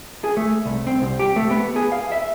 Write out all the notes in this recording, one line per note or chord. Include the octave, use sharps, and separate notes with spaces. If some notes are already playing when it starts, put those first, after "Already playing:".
G#4
A3
C2
C4
C2
G4
A3
B3
G#4
F5
E5